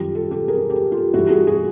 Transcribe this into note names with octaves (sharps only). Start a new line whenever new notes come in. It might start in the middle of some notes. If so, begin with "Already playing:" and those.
Already playing: F#2 D#3 G3 F4 G4
G4 A4
G4 A4
G#4 A#4
G4 A4
F4 G4
G2 E3 G3 E4 F#4
F#4 G#4
F#4 G#4